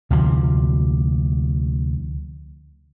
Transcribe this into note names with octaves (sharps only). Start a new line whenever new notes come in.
D2 C3 F3